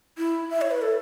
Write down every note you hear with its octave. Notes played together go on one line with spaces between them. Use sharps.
E4
E5
C#5
B4
A4